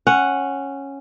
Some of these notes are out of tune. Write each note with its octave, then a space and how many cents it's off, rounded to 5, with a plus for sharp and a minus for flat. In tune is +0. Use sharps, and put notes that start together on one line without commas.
C#4 -10 F#5 +0